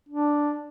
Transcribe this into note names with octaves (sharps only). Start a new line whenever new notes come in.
D4